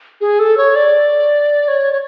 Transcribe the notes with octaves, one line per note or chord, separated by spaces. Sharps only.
G#4
A4
C#5
D5
C#5
C#5